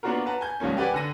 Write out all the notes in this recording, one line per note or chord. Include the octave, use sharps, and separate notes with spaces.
A#3 B3 D4 F4 F#4 A#4
B4 F#5 A5 A#5
G#5 G6
C#2 G2 F3 A#3 C#4
G4 B4 D5 F#5 G#5
D3 A4 A#6 D#7